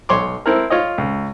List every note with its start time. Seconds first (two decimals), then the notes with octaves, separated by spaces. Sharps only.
0.09 B1 C#5 C6 D6
0.46 C4 E4 A4 A#4
0.70 F4 C#5 D#5
0.98 C#2